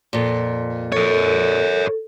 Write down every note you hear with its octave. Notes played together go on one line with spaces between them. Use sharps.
F2 A#2
A4 A#4 C#5